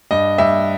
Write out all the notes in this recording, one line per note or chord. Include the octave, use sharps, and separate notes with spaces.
G2 D#5
G2 E5